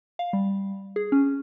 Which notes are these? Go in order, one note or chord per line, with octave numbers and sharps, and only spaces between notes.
F5
G3
G#4
C#4